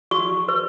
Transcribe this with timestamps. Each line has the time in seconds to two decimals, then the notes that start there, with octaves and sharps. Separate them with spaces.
0.11 F#4 C#6
0.49 B4